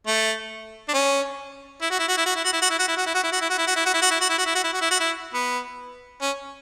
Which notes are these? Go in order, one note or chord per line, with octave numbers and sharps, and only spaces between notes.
A3
D4
C#4
E4
F#4
E4
F#4
E4
F#4
E4
F#4
E4
F#4
E4
F#4
E4
F#4
E4
F#4
E4
F#4
E4
F#4
E4
F#4
E4
F#4
E4
F#4
E4
F#4
E4
F#4
E4
F#4
E4
F#4
E4
F#4
E4
B3
C#4